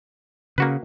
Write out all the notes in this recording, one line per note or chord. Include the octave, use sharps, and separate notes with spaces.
C#3 A#3 F#4 B4